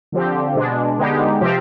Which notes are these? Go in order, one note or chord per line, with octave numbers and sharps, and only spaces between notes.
D3 F3 C4 G4
B2 G#3 D4
D3 G#3 B3 D#4 G4
C3 F3 C4 G4